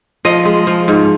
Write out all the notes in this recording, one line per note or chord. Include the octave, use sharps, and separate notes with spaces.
F3 D#5
G#3
F3
G#2